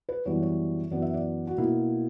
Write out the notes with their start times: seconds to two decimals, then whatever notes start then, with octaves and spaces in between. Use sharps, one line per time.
0.09 B4
0.25 F#2 E3 G3 B3 C#5
0.42 C#5
0.91 F#2 E3 B3 D5
1.02 E5
1.14 D5
1.47 F#4
1.58 B2 A#3 E4